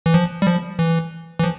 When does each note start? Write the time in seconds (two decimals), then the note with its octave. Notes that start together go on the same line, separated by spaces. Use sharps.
0.06 E3
0.14 F3
0.42 G3
0.47 F3
0.79 E3
1.39 E3
1.44 F3